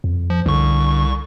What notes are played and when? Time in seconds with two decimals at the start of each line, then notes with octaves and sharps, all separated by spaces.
0.04 F2
0.30 F3
0.46 C2 D3 C#6